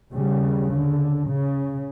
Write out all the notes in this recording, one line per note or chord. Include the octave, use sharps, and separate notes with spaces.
D#2 C#3 G3
D3
C#3